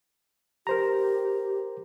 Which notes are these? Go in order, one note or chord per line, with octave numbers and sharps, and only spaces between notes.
G4 A#4 C5 A#5